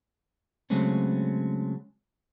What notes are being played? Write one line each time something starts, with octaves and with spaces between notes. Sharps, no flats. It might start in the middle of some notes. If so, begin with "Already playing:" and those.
C#3 F#3 G#3 A3 C4 C#4